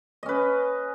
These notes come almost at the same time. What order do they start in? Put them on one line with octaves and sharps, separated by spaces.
D#5 C#4 B4